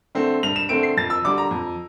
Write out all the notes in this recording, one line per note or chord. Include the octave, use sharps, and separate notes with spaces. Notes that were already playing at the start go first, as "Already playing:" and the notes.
D3 A3 C4
G2 F7
E7
D3 A3 C4 D7
C7
F2 A6
E6
D3 G3 D6
A#5
F2